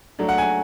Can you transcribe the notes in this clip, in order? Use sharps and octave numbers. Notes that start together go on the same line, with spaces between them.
F#3 A3 D4
F#5
G#5